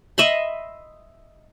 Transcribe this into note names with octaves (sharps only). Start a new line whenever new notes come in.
D#5 E5 B5 C6